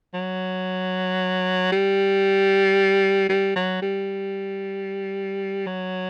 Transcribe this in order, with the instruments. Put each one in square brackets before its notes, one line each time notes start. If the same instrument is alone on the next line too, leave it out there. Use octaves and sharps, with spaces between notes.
[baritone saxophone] F#3
G3
G3
F#3
G3
F#3